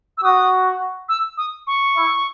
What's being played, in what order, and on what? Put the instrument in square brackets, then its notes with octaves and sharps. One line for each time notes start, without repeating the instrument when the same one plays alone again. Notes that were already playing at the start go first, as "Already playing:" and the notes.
[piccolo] E6
[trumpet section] F#4 [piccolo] D#6
[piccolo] E6
D#6
C#6
[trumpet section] E4